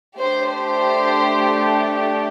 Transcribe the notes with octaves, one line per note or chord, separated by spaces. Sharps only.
A3 D4 G4 C5
C5